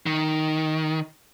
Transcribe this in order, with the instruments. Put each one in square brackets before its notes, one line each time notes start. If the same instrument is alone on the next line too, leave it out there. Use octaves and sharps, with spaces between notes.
[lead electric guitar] D#3